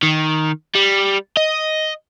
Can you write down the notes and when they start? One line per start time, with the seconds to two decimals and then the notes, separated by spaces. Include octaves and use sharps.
0.03 D#3
0.75 G3
1.37 D#5